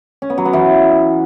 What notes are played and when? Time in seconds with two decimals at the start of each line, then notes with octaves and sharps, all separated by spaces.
0.22 C#4
0.30 B3
0.38 F#3
0.45 B3
0.53 E3